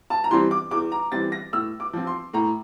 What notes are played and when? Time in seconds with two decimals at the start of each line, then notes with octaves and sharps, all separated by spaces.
0.10 A5
0.24 A#5
0.31 E3 G3 C4 C6
0.51 D6
0.71 E2 D6
0.92 A#5
1.12 E3 G3 C4 A6
1.32 A#6
1.52 A2 E6
1.80 D6
1.93 F3 C4
2.07 C6
2.33 A2 A#5